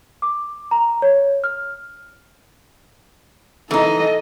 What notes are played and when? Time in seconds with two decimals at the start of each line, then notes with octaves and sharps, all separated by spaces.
0.22 D6
0.71 A#5
1.02 C#5
1.44 F6
3.71 E3 D#4 A4 D#5